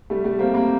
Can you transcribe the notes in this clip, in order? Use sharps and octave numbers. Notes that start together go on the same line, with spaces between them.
G3 A3
G3 A3
A#3 C4
A#3 C4